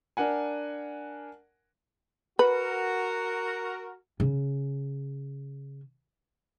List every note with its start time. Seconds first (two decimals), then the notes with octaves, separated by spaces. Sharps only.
0.17 D4 A#4 F#5 G#5
2.39 F#4 A#4 B4
4.20 C#3 C#4